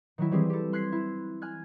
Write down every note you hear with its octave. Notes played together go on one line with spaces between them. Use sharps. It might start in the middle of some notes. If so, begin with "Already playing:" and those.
D#3 F#3 E4
E3 G3 C4 G4 G#4 C5
G4 A4
C6 F#6 G#6 B6 C7
E4
G#5 F6 F#6 G#6